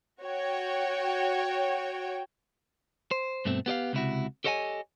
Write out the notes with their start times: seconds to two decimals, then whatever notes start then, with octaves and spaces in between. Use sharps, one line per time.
0.22 F#4 C#5 G5
3.11 C5
3.45 G2 B2 A3 C4
3.66 B3 G4 D5 F5
3.93 C#2 C3 E4 F#4
4.44 G4 A4 C#5 D#5 F#5 G#5